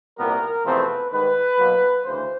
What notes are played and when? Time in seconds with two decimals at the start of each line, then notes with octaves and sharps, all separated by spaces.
0.18 C2 A#2 G3 B3 A#4
0.65 E2 C3 F3 A3 C4 B4
1.12 G#2 D#3 G3 B4
1.59 B2 F#3 A#3
2.05 D2 C#3 E3 C5